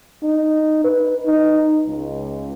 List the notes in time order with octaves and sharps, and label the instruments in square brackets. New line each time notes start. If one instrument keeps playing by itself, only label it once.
[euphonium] D#4
B4
D#4
C#2